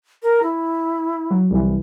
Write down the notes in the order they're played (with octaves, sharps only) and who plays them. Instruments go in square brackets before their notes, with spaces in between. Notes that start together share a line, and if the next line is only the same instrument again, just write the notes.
[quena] A#4
E4
[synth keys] F#3
C2 E3